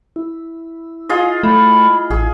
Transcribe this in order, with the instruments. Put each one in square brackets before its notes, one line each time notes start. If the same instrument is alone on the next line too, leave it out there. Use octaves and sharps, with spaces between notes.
[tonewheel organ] E4
[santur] F4 G#4 D#5
[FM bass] A3 [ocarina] B5
[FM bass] A1 [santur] G#4